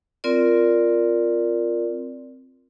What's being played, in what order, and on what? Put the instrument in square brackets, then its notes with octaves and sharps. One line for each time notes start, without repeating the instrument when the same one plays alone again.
[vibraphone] C4 F4 A#4 D5